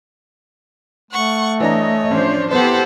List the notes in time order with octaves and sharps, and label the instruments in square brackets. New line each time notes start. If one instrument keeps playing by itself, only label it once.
[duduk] A3 [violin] F#5 C#6
[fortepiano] E3 D4 A#5 [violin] C#5 [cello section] D#5
[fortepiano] A1 [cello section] F3 D4 C5
[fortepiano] B3 [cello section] E4 G4 C5 [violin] A4 F#5